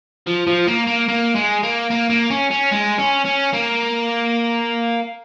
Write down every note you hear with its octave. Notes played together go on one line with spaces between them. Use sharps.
F3
F3
A#3
A#3
A#3
G#3
A#3
A#3
A#3
C#4
C#4
G#3
C#4
C#4
A#3